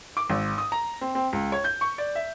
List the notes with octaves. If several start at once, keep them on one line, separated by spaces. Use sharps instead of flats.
D6
G#1
D#6
A#5
C4
C4
C#2
C#5
G6
C#6
D5
E5